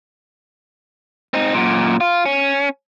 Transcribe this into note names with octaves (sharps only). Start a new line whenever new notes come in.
C4 D#4
F#2 A#2
F4
C#4